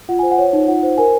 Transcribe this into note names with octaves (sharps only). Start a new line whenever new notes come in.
F4 F#5
C5 G#5
F#5
C#5
D#4
F4 F#5
C5
A#4 G#5